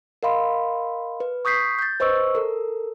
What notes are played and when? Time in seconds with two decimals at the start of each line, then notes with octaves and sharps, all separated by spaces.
0.23 A#4 D#5 F5 B5 C6
1.20 B4
1.45 C#6 D#6 G6 B6 C7
1.79 G6 A6
2.00 B4 C5 D#5 C#6 E6
2.35 A4 A#4